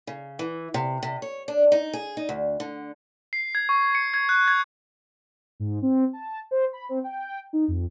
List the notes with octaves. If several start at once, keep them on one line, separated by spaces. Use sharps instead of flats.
C#3
E3
C3
C3
C#5
D4
D#4
G#4
D#4
D2
D3
C7
G#6
C#6
C#7
G#6
F#6
G#6
G#2
C4
A5
C5
B5
C4
G5
D#4
F2